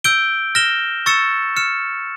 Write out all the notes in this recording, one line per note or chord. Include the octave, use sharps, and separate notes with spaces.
E6 G6 D7 G7
F6 A#6 E7 G7
C#6 E6 A6 C#7 E7
F6 C#7 E7